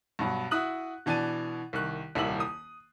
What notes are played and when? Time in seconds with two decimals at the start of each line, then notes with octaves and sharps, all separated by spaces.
0.19 G2 B2 F#3 F#5
0.51 E4 F#4 D#6 F#6 F#7
1.06 B2 E3 D4 G#5 A6 D#7
1.73 C2 D#3 C#6 F#6
2.15 D#1 C2 D#3 E4 E6 F#7
2.40 D#6